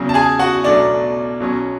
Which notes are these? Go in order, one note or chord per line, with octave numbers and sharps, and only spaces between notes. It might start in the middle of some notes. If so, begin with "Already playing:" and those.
Already playing: E2 C#3 F#3
A5
G#4 G#5
F#4 F#5
B1 B2 F#3 A3 D4 D5
B1 B2 F#3 C#4